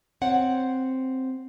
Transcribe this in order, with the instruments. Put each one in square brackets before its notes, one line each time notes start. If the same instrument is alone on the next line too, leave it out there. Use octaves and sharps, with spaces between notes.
[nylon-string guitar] C4 C#5 F#5